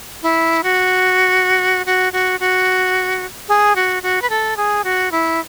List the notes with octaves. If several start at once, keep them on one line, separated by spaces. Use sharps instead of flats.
E4
F#4
F#4
F#4
F#4
G#4
F#4
F#4
B4
A4
G#4
F#4
E4